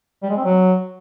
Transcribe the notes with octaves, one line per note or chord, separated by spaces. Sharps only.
G3
G#3
C4
F#3